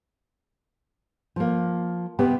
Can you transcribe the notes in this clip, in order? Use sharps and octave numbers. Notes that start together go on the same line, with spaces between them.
F3 A#3
C3 B3 G4